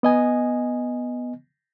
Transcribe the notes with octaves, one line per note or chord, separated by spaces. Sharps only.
B3 D#5 G#5